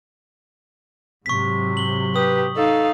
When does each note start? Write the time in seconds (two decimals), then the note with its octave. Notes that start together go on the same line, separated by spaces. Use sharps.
1.26 G#2 C3 F#3 C#6 B6
1.77 F#7 G7
2.16 G4 B4 D#6
2.57 D#4 A4 F5